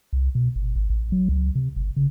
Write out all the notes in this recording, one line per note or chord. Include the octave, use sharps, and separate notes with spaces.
C2
B2
G1
G#1
A1
F#3
C#2
C3
G1
C#3